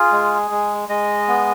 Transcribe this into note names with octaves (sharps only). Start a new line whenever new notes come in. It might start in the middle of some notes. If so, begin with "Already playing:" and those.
Already playing: F4 G#4
G#3
G#3
G#3 D#5
B3